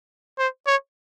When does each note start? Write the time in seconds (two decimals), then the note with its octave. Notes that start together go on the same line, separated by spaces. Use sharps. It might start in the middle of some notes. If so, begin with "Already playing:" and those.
0.39 C5
0.67 C#5